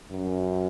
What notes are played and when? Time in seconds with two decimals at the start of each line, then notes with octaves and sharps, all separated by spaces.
0.11 F#2